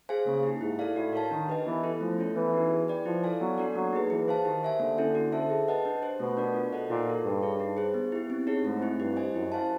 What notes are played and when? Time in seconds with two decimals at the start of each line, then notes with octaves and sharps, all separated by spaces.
0.09 G#4 C5 F5 G#5
0.26 C#3 A#3
0.43 D#4 G4
0.61 G#2 E4
0.79 A4 D5 F5
0.96 A2 F#4
1.13 A#4 C#5 F5 A5
1.31 D#3 D4
1.49 G4 B4 D#5 G#5
1.66 E3 B3
1.84 E4 A4
2.01 F3 A3
2.19 C#4 E4 A4 C#5
2.36 E3 B3
2.53 D#4 F#4
2.70 G#4
2.88 B4 D5 G5
3.06 F3 E4
3.24 A4 D5 F5 G#5
3.40 F#3 B3
3.58 D4 F#4 A4 D5
3.76 F#3 A#3
3.93 D#4 G#4 B4
4.10 E3 G#4
4.28 C5 F5 A5
4.45 D#3 G4
4.63 C5 E5 G#5
4.80 D3 A#3
4.98 C#4 E4 A4
5.15 F#4
5.32 A4 C5 E5 A5
5.50 G#4
5.68 B4 D#5 F#5 A5
5.85 D4
6.02 G4 C5
6.20 B2 A3
6.37 D4 F#4 A#4 D5
6.54 F4
6.73 A4 C5 D#5 F#5
6.90 A#2 D#4
7.08 F#4 A4
7.24 G2 D#4
7.43 G#4 C#5
7.60 D#4
7.77 G#4 C5
7.94 B3
8.12 E4 G4
8.30 C4
8.47 D#4 G#4 C#5
8.65 G#2 A3
8.82 C4 E4
8.99 G2 G4
9.16 C5 D#5 G#5
9.34 F#2 E4
9.52 G4 C5 F5 A5